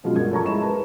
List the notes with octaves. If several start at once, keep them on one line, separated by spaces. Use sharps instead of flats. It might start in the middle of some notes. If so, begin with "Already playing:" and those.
B2 F3 F#3 G#3 C#4 F4
G2 A#4 G#6
A4 C#5 A5 A#5 C#6
G#3 E4 E7
A#4 B4